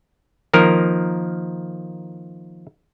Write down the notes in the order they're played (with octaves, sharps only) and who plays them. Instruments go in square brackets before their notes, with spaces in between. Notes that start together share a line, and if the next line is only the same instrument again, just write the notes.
[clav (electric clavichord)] D#3 F3 A#3 A#4